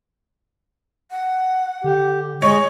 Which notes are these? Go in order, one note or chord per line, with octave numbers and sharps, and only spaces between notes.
F#5
D3 G4
G#3 C#5 D#5